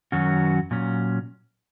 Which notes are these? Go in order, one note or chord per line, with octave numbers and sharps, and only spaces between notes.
F#2 D#3 F#3 C#4 F#4
A#2 F#3 C#4